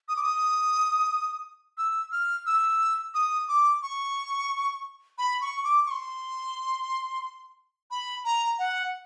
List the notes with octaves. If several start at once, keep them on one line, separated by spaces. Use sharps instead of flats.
D#6
D6
D#6
E6
F6
E6
D#6
D6
C#6
B5
C#6
D6
C#6
C6
B5
A#5
F#5